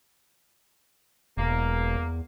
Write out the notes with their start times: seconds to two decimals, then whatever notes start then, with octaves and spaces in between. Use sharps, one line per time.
1.37 E1 E2 A#3